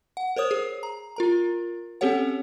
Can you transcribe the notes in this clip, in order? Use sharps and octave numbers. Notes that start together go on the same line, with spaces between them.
F#5
A#4 C5 C#5 D#6
G#4
A#5
F4 A#4 A#5
C4 C#4 G4 A4 C#5 F#5